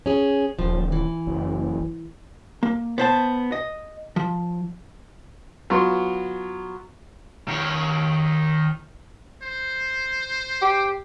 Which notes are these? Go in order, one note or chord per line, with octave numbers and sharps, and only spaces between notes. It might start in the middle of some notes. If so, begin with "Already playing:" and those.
C#4 G#4
D#1 F3
E3
F#1
A#3
B3 C5 A5
D#5
F3
F#3 B3 F4 C6
D#3 C#5
C5
G4